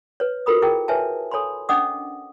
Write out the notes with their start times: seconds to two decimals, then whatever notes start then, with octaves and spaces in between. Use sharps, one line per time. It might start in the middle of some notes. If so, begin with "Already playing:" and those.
0.20 B4 C#5
0.46 F4 F#4 A4 A#4 B5 D#6
0.62 E4 G#4 A#4 G5
0.88 B4 C#5 E5 G#5 A5
1.31 A4 C#5 G#5 B5 C6
1.69 C#4 D4 D#5 F#5 D6 D#6